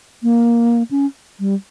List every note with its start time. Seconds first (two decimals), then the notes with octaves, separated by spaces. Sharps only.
0.23 A#3
0.91 C#4
1.40 G3